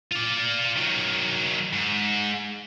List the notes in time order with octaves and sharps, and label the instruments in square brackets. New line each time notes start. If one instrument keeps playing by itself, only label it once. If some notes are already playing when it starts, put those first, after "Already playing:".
[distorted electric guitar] F4 D5
D#3 F#3
G#2